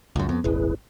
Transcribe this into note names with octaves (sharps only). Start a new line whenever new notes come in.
C#2 F#2
F2 B3
D#1 G#1 E4 G#4 B4